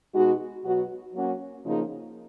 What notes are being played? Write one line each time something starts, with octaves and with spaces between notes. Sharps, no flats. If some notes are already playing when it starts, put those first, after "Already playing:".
B2 G#3 D#4 F#4
B2 F#3 B3 F#4
F#3 A#3 C#4 F#4
C#3 F3 A#3 D#4 G#4